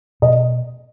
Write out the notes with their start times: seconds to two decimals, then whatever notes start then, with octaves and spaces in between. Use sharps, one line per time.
0.22 B2 D#5